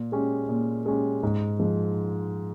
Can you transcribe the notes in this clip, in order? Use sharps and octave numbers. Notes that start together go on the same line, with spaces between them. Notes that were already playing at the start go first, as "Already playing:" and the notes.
Already playing: A#2
G#3 C#4 G4
A#2
G#3 C#4 G4
G#2
F3 G#3